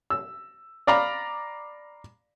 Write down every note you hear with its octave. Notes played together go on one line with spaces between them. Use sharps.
E6
D5 F5 A#5 B5 D6